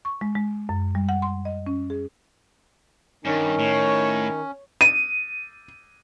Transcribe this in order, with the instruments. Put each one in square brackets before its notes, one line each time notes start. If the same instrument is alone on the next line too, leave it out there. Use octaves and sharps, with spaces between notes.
[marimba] C#6
G#3
G#3
F#2
G3
F#5
C6
D#5
C#4
G#4
[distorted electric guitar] G2 [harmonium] D#3 D#4 [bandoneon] C#4
[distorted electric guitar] A2 [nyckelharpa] C#5
[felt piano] D#7